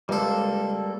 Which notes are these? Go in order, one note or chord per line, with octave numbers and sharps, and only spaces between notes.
C#2 G3 A#3 A4 C5